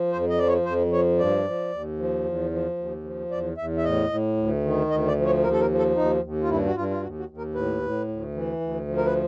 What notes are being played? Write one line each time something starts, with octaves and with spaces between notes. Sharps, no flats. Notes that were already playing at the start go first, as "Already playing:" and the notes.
Already playing: F3
F2 C5
D#5
F3 D5
C#5
F2 C5
F3 C#5
G2 D5
F3
D#2
F3
E2
F3
D#2
F3
E2 D5
E2 E5
E5
A2 D#5
A2
D2
D#3
D2 D#5
D5
F3
C#5
D#2 A#4
A4
A#4
F3
A4
D#2 D#4
D#2
F4
G2 E4
F#4
G2 F4
F4
D#2 F#4
F#4
D#2
A#4
A2 B4
A2
D2
E3
D2
F3
A#4
B4